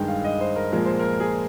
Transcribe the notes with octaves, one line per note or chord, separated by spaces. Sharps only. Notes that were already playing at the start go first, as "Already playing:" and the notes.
Already playing: G2 D#3 G#3 G5
F5
D#5
C5
A#4
A#2 F3 G#3 A#4
C5
A#4
G#4